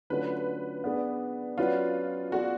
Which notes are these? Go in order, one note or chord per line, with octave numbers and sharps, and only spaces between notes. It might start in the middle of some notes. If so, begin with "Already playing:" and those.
D3 F#3 A3 C#4 F4 B4
B3 D4 G#4 D5
F#3 C#4 F4 F#4 B4 D5
B3 F4 F#4 G#4 D5